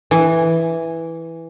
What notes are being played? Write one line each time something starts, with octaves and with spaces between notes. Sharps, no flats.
E3